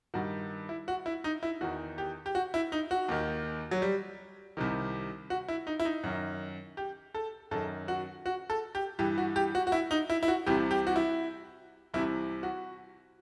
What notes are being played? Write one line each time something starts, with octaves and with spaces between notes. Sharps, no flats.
G2 D#3 F#4
E4
F#4
E4
D#4
E4
E2 D#3 F#4
G4
G4
F#4
E4
D#4
F#4
D#2 D#3
F#3
G3
C2 C3 D#3
F#4
E4
D#4
E4
D#4
F#2 D#3
G4
A4
F#2 D#3 A4
F#4
F#4
A4
G4
G2 E3 G4
F#4
G4
F#4
F#4
E4
D#4
E4
E4
F#4
C2 C3 E3 G4
G4
F#4
E4
C2 C3 E3 E4
F#4